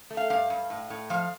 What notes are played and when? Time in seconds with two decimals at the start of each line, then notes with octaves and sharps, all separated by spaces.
0.10 A3
0.17 F5
0.30 G2 F5
0.50 G2
0.70 A2
0.90 A2
1.10 F3 F5